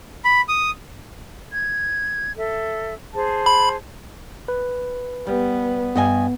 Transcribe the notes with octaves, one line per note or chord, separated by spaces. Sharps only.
B5
D#6
G#6
A4 E5
G#4 C5 A5
B5
B4
G3 B3
G2 B3 D#5 G#5